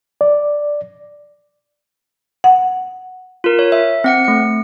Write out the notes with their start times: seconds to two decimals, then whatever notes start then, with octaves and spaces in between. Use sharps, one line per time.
0.21 D5
2.44 F#5
3.44 F4 A#4
3.59 C#5
3.72 E5
4.04 C4 F#5 C#7
4.24 A3 C#7